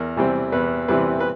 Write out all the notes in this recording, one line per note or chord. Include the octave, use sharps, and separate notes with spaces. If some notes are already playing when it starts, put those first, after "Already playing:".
Already playing: E2 A#4
C3 E3 G3 C4
E2 B4
C3 E3 G3 C4 B4
B4